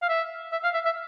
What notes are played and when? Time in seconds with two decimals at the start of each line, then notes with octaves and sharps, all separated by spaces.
0.02 F5
0.09 E5
0.52 E5
0.64 F5
0.74 E5
0.85 E5